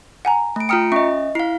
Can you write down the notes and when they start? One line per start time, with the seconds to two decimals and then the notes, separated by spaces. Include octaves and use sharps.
0.25 F#5 G#5 A#5
0.56 A3 D7
0.69 F4 G5 A#5 D#6 F6 C#7
0.92 C#4 D#5 E5 C#6
1.35 E4 F5 C7